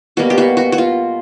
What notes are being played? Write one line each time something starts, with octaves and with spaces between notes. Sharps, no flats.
B2 G3 A#3 F#4
G4
F#4
F#4
F#4
F4